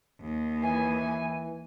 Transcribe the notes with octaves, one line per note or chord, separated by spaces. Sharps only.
D#2
E3 G#5